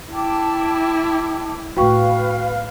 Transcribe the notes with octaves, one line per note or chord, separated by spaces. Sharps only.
E4 G5 A5 D6
A2 A3 F#4 B4 F5 G5 C#6